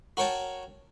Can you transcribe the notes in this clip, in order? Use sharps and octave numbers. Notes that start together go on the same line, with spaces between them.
F#4 A#4 C#5 G5 A5